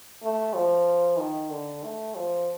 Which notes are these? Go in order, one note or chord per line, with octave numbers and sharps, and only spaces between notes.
A3
F3
D#3
D3
A3
F3